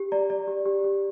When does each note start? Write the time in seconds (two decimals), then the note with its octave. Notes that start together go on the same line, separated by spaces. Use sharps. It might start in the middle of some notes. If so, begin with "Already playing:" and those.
Already playing: G4
0.12 D5 A#5
0.30 D5
0.47 G4
0.66 G4
0.84 G4